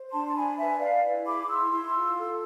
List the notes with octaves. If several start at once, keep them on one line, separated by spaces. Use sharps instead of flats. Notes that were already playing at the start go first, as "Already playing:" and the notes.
Already playing: C5
D4 A5 C6
A5
D4 G#5 B5
B4 E5 G#5
B4 D5 F5
E4
G#4 B5 D6
D6
E4 C6 E6
E4
F4
A4